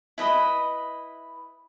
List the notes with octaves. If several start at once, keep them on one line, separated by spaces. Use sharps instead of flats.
E4 B4 D#5 B5